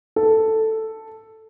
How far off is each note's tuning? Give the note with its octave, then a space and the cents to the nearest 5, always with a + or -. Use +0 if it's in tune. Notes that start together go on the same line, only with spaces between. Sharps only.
A4 +5